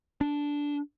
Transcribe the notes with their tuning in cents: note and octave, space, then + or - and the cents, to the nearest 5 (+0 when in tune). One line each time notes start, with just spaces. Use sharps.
D4 -10